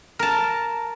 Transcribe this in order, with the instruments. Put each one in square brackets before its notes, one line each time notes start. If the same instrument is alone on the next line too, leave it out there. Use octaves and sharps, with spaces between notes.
[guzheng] A#4 A5